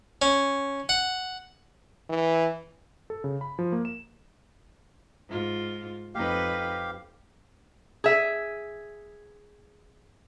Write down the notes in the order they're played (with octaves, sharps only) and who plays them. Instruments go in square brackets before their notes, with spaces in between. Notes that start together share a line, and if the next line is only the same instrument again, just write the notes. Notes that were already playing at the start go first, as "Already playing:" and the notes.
[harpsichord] C#4
F#5
[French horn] E3
[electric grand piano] A4
C#3
B5
F3
A#3
E7
[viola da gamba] G#2 F4
[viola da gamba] F2 D#4 B4 [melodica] G4 F5
[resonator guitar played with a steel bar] G#4 E5